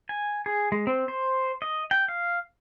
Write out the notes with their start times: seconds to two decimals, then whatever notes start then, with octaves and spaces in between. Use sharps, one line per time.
0.09 G#5
0.46 G#4
0.72 G#3
0.87 C4
1.08 C5
1.62 D#5
1.91 G5
2.08 F5